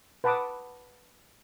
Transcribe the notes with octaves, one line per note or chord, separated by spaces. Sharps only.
B4 F#5 A5 B5 D6 D#6